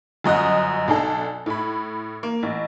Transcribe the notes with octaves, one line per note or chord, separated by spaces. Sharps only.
G1 F#2 D#5 F#5 D#6
B1 D4 A4
A2 B5
A#3
A1